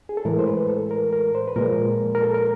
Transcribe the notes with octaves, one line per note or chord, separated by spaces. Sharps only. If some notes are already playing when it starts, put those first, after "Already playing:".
G#4
A4
A2 E3 G#3 A#4
C5
B4
A4
A#4
A#4
C5
B4
A#2 F3 G#3 A#4
A#4
A4
A#4